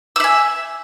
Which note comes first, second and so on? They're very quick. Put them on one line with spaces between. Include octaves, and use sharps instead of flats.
E6 E5 G#5